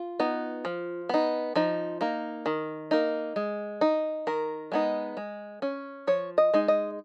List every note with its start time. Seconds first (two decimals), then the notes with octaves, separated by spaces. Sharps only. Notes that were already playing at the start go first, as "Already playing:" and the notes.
Already playing: F4
0.19 B3 D#4
0.65 F3
1.09 B3 D#4
1.56 F3 D#4
2.01 A#3 D#4
2.46 D#3
2.91 A#3 D#4
3.36 G#3
3.81 D#4
4.27 D#3 A#4
4.72 G#3 B3 D#4
5.17 G#3
5.62 C#4
6.07 F3 C#5
6.38 D#5
6.54 G#3 D#4
6.68 D#5